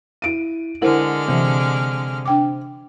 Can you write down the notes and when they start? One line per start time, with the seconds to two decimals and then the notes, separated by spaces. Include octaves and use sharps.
0.22 E4 D7 D#7
0.82 D3 G#3 E4 A#4 C5 F#5 F6
1.28 C3 E3
2.25 D4 G5 D6